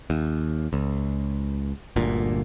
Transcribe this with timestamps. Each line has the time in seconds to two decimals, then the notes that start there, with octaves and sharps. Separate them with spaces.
0.10 D#2
0.73 C#2
1.96 G1 D2 A#2